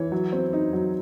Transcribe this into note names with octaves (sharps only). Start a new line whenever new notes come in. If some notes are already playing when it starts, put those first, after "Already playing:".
Already playing: E3 C#5
F#3
C4
D#4
F#3